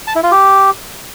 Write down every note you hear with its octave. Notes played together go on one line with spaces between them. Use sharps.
A5
E4
F4
G4